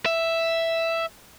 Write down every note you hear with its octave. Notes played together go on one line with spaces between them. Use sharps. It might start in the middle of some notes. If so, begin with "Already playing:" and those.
E5